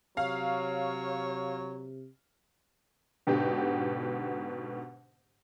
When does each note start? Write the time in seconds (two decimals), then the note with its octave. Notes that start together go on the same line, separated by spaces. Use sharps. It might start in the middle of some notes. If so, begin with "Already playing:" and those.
0.17 C3 F#3 C#5 F5
3.27 G#2 B2 D3 G4